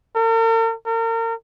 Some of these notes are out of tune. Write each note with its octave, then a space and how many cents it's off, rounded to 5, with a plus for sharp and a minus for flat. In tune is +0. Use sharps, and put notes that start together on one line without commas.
A#4 -45
A#4 -35